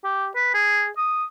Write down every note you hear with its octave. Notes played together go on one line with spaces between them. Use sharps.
G4
B4
G#4
D#6